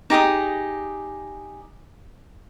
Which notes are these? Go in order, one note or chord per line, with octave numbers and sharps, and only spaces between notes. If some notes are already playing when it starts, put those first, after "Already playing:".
D#4 G4 G#4 D#6